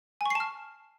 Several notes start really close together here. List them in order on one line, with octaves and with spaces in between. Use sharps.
G#5 C#6 C7 A5 F6